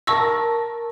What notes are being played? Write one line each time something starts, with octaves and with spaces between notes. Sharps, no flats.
A#4 A5 C#6 E6 A#6